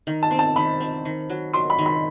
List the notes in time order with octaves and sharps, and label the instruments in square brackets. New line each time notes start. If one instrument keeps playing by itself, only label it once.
[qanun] D#3
[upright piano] A5
[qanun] C4
[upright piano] A5
[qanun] D#3 [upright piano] B5
[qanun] C4
D#3
F#3
[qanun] F#3 [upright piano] C6
[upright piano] B5
[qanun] D#3
[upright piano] B5